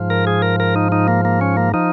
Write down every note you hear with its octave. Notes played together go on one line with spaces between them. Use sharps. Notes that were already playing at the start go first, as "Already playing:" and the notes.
Already playing: G#2 F3
A#4
G#4
A#4
A#4
D#4
D#4
A#3
A#3
C#4
A#3
F3 D#4